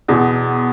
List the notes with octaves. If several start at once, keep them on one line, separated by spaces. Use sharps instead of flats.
E2 B2